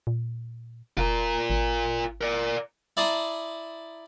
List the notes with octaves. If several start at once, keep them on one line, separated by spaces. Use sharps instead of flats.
A#2
F1 F4 A#4
G#1
A#4 D5
E4 D5 A5 A#5 C6 D#6